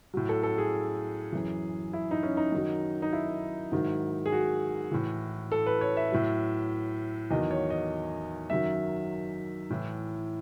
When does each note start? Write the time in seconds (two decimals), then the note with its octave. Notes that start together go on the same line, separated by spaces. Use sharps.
0.14 A2 F#3
0.29 A4
0.43 A4
0.58 G#4
1.33 F#2 E3
1.93 E4
2.11 D#4
2.23 C#4
2.37 D#4
2.52 F#2 D#3 F#3
3.02 D#4
3.13 E4
3.72 G#2 D#3 F#3
4.26 G#4
4.32 F#4
4.92 A2 E3
5.52 A4
5.66 B4
5.81 C#5
5.97 E5
6.12 A2 F#3
7.31 E2 D#3 F#3 D#5
7.51 C#5
7.70 D#5
8.50 F#2 D#3 F#3 E5
9.70 A2 E3